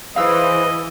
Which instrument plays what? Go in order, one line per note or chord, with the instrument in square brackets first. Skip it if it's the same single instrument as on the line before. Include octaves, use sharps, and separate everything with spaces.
[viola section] E3 [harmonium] G#4 B4 C5 [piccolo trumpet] D#5 [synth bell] F5 E6